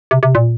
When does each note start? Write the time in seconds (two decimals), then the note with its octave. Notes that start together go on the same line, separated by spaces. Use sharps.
0.11 C3
0.23 C3
0.35 A#2